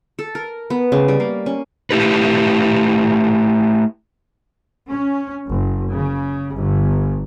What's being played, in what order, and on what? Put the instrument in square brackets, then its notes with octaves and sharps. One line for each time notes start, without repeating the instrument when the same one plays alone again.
[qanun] A4
A#4
B3
C#3
G3
A#3
C#4
[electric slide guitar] A3 E4 G4 B4
[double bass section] C#4
F#1
C#3
G1